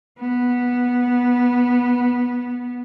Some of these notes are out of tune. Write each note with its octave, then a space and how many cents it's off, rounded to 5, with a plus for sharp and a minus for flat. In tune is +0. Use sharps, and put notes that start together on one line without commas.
B3 -10